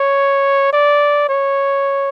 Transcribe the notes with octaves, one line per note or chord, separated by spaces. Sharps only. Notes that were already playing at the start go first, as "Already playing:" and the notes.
Already playing: C#5
D5
C#5